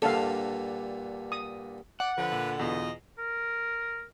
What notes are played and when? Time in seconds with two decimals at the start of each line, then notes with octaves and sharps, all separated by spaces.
0.02 G2 A#2 D3 A4 F5
1.32 D#6
2.00 D5 F#5
2.18 D3 F3 B4
2.32 A#2
2.59 E2 B2 F4 D#5
3.19 A#4